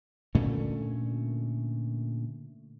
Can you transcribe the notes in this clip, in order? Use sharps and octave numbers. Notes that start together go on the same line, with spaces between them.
A#2 D3 A3 C#4